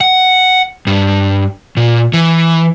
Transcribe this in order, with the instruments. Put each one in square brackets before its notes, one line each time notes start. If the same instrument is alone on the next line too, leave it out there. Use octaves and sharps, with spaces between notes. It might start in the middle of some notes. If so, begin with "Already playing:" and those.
[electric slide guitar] F#5
G2
A#2
E3